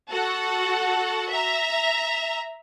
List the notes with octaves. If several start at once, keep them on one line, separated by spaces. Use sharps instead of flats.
F#4 A4 F#5
E5 A#5